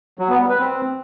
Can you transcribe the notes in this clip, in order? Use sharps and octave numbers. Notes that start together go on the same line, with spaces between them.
F#3
B3
G3
B4
C4